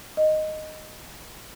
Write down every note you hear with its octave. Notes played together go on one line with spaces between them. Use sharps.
D#5